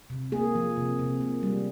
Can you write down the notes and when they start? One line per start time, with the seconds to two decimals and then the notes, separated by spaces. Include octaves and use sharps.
0.10 C3
0.32 A#3 G#4
0.55 F3
0.77 C3
0.99 C3
1.21 A#3
1.43 G3